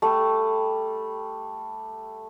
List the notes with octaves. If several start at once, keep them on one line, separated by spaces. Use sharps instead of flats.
G3 A3